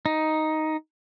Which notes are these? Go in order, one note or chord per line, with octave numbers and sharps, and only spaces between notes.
D#4